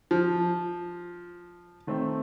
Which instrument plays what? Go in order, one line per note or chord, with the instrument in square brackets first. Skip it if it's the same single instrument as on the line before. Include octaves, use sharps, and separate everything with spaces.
[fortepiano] F3
[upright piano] D#3 A3 C4